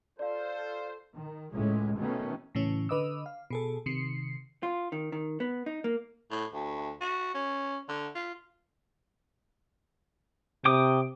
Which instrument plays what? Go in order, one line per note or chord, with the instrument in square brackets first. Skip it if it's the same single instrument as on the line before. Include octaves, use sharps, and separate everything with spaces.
[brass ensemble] F4 A4 C5 [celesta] D5 F5
[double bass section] D#3
C#2 A2 G#3 C#4
B2 D#3 A3 B3 C#4
[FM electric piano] A2 C#3 E3 C#4
D3 B4 D#5 D6 E6
F5
B2 G#4 A4
C3 D#3 C7 C#7
[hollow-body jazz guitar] F4
D#3
D#3
B3
D#4
A#3
[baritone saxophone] A2
D2
F#4
C#4
D3
F4
[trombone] C3 [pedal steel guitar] G5 D6 D#6